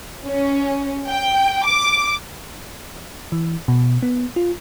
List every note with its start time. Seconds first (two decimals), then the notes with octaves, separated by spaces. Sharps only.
0.25 C#4
1.07 G5
1.65 D6
3.32 E3
3.68 B2
4.03 B3
4.36 F4